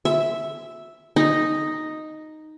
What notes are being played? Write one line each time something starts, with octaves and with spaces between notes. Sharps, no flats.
E5
D#4